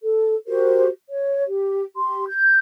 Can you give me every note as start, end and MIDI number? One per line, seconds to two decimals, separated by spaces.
0.03 0.36 69
0.47 0.87 66
0.47 0.87 67
0.47 0.87 70
0.47 0.87 72
1.09 1.43 73
1.47 1.84 67
1.96 2.24 67
1.96 2.24 84
2.27 2.59 91